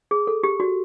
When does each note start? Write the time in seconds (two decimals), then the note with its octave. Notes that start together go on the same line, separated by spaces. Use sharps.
0.11 G#4
0.27 A4
0.43 G4
0.60 F#4